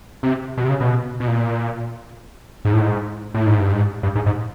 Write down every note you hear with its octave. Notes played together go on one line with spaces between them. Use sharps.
C3
B2
C3
C#3
B2
B2
A#2
G#2
A2
G#2
A2
G#2
G2
G#2
G2
G#2
G#2